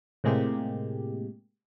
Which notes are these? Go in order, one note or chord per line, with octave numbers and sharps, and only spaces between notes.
A2 C3 G#3 A#3 G4